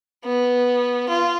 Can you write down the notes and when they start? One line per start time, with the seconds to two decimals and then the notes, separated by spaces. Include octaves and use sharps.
0.25 B3
1.09 F4